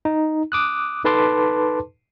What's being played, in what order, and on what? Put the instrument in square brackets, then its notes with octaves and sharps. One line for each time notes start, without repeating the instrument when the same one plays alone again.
[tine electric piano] D#4
D6 D#6 F#6
D#4 A4 B4 A5 C6 D6